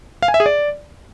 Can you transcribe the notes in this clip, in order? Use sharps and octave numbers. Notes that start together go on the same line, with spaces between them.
F5
G#5
E5
G#4
D5